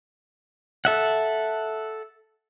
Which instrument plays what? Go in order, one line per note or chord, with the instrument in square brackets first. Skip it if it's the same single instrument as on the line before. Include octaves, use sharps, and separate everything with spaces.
[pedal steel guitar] A4 E5 F#5